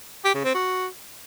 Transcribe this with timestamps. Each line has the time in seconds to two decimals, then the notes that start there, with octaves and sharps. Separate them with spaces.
0.25 G4
0.35 C#3
0.45 C4
0.55 F#4